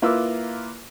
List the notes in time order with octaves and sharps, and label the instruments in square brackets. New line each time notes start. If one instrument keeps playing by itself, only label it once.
[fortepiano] A#3 E4 F4 B4 D6 E6